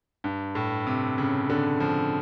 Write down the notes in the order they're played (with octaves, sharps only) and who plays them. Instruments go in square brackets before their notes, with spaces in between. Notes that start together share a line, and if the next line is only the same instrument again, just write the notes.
[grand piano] G2
A2
C3
C#3
D3
F3